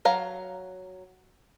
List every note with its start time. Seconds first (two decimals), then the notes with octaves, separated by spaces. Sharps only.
0.05 F#3 F5 A#5